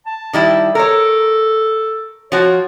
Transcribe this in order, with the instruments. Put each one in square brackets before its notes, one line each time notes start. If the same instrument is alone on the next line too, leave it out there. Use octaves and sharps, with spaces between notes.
[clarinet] A5
[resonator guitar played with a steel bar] D#3 G3 E4
[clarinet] A4 [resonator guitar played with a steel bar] A#4 C#5
[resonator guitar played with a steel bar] F3 F#4 [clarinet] C#5